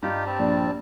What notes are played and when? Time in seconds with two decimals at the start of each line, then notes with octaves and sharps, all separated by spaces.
0.03 G2 D#4 F4 G4
0.26 G3 C4 A5
0.39 A#1 D5